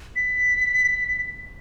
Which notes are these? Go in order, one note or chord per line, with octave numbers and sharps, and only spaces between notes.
B6